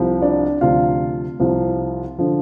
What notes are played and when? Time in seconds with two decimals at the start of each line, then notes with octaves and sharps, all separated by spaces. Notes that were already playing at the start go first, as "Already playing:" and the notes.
Already playing: C2 C3 F3
0.21 D4 D5
0.61 D2 C3 F3 F4 F5
1.40 C2 C3 F3
2.19 D3 F3